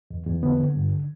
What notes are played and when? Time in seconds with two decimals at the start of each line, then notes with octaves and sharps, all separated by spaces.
0.11 E2
0.27 E2
0.43 D3 B3
0.60 D3
0.76 G2